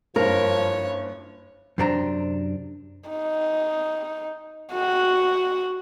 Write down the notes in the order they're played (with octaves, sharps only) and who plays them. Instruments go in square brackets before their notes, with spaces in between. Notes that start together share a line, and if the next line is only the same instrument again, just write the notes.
[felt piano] F#1 G2 [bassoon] F3 [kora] A#4 [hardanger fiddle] C#5
[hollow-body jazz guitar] F#2 C3 C4 D4 A#5
[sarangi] D#4
F#4